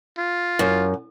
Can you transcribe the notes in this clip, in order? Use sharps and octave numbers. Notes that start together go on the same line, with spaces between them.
F4
F#2